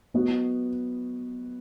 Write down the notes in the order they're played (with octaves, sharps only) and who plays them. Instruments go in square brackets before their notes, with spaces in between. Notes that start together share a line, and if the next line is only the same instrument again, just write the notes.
[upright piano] F#3 B3 F#4 B4 D#5